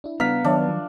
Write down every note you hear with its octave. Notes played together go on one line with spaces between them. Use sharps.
D4 E4
C#3 G3 B3 D4 F5 A#5 B6
D#3 F#3 D4 B4 C#5 E5
F3